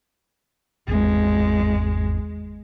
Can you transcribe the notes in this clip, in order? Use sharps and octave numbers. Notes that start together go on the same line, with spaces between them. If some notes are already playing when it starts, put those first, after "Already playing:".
G#1 E2 G#3 C4